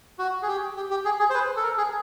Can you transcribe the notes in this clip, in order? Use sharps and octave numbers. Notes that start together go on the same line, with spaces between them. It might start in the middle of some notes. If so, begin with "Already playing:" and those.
F#4
G#4
G4
G4
G4
G#4
G#4
C5
B4
A4
A#4
G#4